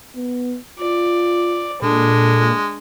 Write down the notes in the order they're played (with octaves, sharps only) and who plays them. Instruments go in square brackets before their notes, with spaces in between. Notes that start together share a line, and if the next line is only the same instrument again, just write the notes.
[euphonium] B3
[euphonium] F4 [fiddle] D5
[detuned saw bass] A#2 [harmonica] G#3 [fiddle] D4 [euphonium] A4